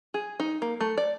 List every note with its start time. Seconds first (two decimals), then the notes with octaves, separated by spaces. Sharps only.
0.14 G#4
0.40 D#4
0.62 A#3
0.81 A3
0.98 D5